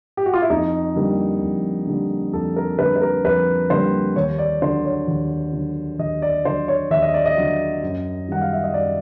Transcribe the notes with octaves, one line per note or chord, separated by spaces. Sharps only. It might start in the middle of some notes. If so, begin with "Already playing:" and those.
G4
F#4
F4
E4
F2 D#4
D3 G3 A#3
F2
D3 G3 A#3
F2 A4
A#4
D3 G3 A#3 B4
B4
A#4
F2 B4
D3 G3 A#3 C5
D#2 C#5
D5
D3 F#3 C5
C#5
D#2
D3 F#3
D#2 D#5
D5
D3 F#3 C5
C#5
D#2 E5
D#5
D5
D#5
D3 F#3
F#2
D#3 G3 F#5
F5
E5
D#5
F#2 D5